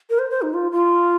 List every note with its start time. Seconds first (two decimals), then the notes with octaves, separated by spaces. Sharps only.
0.10 A#4
0.19 C5
0.30 C5
0.42 D#4
0.54 F4
0.72 F4